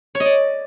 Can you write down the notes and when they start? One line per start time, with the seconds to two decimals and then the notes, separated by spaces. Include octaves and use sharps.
0.15 C#5
0.20 D#5
0.25 D5